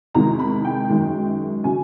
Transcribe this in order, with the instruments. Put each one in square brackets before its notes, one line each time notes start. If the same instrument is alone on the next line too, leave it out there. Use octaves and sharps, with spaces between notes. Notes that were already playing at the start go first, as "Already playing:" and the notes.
[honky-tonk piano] E2 C3 D#3 G#3 A#5
B5
G5
F#2 D#3 G#3
C#3 F#3 G#5